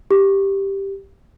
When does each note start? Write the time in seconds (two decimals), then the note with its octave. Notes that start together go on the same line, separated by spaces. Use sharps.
0.11 G4